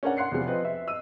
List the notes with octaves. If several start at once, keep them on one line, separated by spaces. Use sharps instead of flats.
C#4 D4 A#4 C#5 F#5
F#5 C6 F#6 C7 C#7
E2 C3 F3 G3
F3 C4 B4 D#5
E5
D#5 E6 D#7